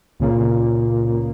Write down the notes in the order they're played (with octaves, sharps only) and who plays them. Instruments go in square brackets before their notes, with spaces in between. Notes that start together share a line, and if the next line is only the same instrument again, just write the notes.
[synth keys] C#2 C#3 A#3 [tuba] A#2